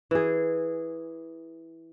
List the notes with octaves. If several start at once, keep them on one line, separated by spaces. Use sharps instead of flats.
E3 G#4